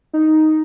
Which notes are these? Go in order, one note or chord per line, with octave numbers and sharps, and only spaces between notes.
D#4